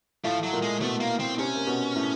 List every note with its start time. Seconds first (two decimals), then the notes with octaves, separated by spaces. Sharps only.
0.24 A2 F3 A3
0.43 F#3
0.53 A#2 A#3
0.63 G#3
0.81 B2 A3 B3
1.01 A#3
1.20 C4
1.39 C3 C4 C#4
1.55 A#3
1.67 B2 B3
1.96 A2 A3